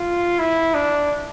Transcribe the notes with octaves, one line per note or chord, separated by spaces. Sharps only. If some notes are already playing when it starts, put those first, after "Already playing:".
Already playing: F4
E4
D4